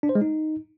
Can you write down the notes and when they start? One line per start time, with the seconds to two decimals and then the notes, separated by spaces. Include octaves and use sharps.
0.03 D4
0.09 C5
0.15 G#3
0.21 D#4